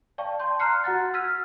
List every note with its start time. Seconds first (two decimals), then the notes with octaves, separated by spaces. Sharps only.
0.18 D5 F5 G5 A5 C#6
0.40 A5 C6 G6
0.59 A#5 C6 F6 F#6 C7 C#7
0.84 F#4 F#5 F#6 A6
1.14 E6 F6 G#6 B6 D#7